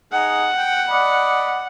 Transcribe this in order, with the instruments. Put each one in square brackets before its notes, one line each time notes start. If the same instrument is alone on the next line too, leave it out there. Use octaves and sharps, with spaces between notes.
[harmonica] D#4 G#4 [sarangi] F#5
[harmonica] G5
D5 D#5 B5